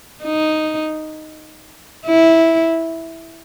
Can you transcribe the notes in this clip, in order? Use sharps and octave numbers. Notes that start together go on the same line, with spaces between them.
D#4
E4